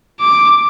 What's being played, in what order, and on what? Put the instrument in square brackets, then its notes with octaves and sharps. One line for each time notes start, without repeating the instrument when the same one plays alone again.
[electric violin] D6